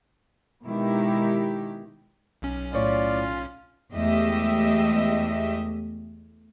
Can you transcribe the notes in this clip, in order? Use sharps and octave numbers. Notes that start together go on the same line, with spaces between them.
B2 D#3 G#3 E4 G4
B1 C#4
A2 F4 C#5 D5
E2 G#3 A3 G4 D#5 E5